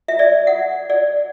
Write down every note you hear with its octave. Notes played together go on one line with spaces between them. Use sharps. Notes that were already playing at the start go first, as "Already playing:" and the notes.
E5
D5
F#5
D5